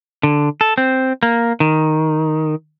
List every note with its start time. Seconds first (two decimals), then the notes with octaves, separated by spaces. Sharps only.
0.23 D3
0.61 A4
0.78 C4
1.23 A#3
1.60 D#3